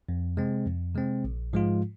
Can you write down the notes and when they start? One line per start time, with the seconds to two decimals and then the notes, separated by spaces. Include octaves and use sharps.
0.09 F2
0.37 C3 G#3 C4
0.65 F2
0.95 C3 G#3 C4
1.24 A#1
1.53 G#2 F3 G#3 F4